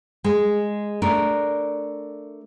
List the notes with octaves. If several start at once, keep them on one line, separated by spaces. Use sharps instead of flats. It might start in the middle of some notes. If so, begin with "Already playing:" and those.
G#3
A3 D4 A#4